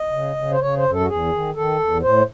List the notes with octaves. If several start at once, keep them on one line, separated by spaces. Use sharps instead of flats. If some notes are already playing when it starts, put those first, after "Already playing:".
Already playing: D#5
C#3
C#3
C5
C#3 C#5
C5
F#2
A4
F#4
E2 G#4
D#3
D#3 A4
E2
A2 C5